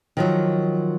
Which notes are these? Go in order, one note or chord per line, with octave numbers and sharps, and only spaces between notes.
D#3 F3 F#3